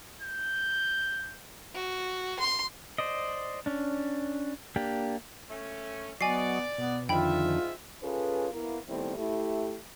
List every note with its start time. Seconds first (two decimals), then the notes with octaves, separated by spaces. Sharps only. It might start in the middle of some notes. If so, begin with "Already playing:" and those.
0.22 G6
1.74 F#4
2.39 C6
2.98 C5 D5 D#5
3.66 C#4 D4
4.76 A#3 D4 G4
5.50 A3 C#4
6.21 F#3 B3 D5 D#5 G#5 C#6 C7
6.78 B2 B3
7.09 F2 G#2 D3 D#3 F4 E5 G5 B5
8.03 C#4 F4 G#4 A4 B4
8.53 A#3 B3 E4
8.88 D#3 G3 A3 B3 C4 E4
9.17 A3 E4 G4